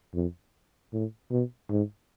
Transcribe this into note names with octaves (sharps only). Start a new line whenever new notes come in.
F2
A2
B2
G#2